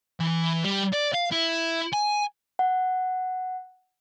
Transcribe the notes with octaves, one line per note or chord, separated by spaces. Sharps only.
E3
G3
D5
F5
E4
G#5
F#5